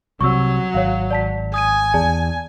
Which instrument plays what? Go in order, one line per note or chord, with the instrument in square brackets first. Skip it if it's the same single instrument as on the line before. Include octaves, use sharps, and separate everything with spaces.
[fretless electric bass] C2 C3 [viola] F#3 [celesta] C#6 E6
[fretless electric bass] G#1 [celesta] C#5 F5
[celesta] D5 A5 B6
[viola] G#5 [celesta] D#6 G#6 D#7
[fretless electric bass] E2 [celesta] G#4 D5 A5